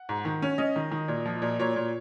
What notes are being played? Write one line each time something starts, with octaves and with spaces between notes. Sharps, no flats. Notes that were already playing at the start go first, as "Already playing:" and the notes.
Already playing: F#5
G#2
D#3
C#4
C#4 D#5
D#3
D#3
A#2
F3
A#2
A#2 C#5
A#2